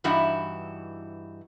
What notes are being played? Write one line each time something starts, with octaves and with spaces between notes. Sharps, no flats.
G2 E3 D#4 E4 F#4